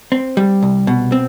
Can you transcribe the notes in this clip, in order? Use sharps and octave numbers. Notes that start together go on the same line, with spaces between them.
C4
G3
C2
B2
C4